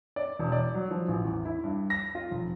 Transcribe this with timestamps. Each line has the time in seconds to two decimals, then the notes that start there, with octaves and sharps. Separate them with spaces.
0.16 D5
0.39 E1
0.52 D5
0.74 F#3
0.91 F3
1.08 A1
1.25 E2
1.45 E4
1.64 G2
1.90 A#6
2.15 F4
2.31 F1